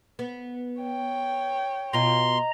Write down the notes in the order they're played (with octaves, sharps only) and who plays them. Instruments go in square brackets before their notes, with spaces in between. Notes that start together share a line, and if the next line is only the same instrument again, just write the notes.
[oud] B3
[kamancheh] C#5 G5
[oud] B2 F4 [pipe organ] D#5 A#5 [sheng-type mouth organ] C6